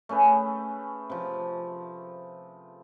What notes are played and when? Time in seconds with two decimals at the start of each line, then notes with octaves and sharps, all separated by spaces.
0.09 A3 C#4 G#4 B4
1.10 C3 F3